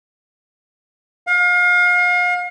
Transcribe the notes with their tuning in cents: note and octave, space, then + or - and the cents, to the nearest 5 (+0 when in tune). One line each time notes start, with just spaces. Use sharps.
F5 +35